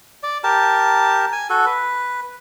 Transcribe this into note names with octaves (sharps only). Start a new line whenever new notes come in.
D5
G4 A#4 A5
G#5
F#4 A4
B4